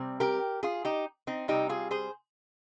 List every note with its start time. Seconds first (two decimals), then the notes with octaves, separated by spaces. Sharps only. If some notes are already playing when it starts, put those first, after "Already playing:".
Already playing: C3 G3 C4
0.20 G4 A#4
0.63 F4 G#4
0.85 D#4 G4
1.27 C4 D#4
1.48 C3 G3 C4 D#4 G4
1.69 F4 G#4
1.91 G#4 C5